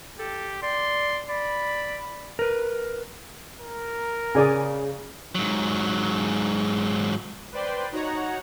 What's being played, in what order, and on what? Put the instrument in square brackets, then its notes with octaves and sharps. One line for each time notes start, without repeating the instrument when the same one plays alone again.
[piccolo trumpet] G4 [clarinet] A4
[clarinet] D5 [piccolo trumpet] C6
[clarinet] D5 [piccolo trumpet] B5
[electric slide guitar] A#4 B4
[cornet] A#4
[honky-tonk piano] C#3 [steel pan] G#4 D5 G#5
[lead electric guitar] G#2 F#3
[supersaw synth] B4 C5 D5 G5 C6
D#4 F#4 C#5 F#5 A#5